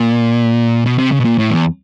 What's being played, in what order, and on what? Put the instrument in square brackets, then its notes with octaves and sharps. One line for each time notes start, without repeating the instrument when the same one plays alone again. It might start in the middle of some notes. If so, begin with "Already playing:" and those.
Already playing: [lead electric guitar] A#2
B2
C3
C#3
B2
A#2
A2
E2